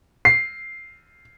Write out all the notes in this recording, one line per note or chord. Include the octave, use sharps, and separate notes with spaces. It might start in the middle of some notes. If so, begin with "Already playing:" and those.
C7